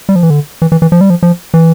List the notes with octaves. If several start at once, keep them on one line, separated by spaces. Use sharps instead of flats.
G3
F3
E3
D3
E3
E3
E3
F3
G3
F3
F3
E3